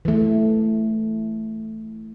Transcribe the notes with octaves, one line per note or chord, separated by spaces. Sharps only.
E3 A3